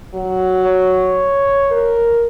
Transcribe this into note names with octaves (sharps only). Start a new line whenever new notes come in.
F#3
C#5
A#4